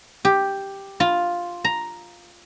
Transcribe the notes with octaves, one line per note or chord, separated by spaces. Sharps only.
G4
F4
A#5